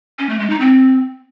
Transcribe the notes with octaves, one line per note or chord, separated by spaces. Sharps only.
C#4
A3
G#3
D#4
C4